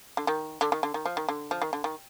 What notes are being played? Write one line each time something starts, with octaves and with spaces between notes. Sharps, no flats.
D3
D#3
D3
D#3
D3
D#3
F3
D#3
D3
F3
D#3
D3
D#3